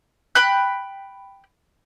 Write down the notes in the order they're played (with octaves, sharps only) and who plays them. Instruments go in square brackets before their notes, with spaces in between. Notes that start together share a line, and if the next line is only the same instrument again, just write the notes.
[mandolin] G5 B5 F#6